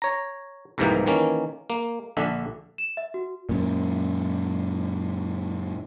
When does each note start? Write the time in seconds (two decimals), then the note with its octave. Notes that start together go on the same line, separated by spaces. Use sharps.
0.02 C#5 A#5
0.78 C2 F2 G#2 C3 E3 A#3
1.06 D#3 E3 A#3 C#4
1.70 A#3
2.17 A#1 D3 D4 E5
2.78 E7
2.97 E5
3.14 F#4
3.49 F#2 A#2